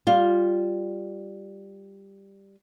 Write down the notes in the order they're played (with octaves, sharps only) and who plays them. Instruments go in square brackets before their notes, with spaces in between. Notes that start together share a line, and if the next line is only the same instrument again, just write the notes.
[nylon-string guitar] G3 F4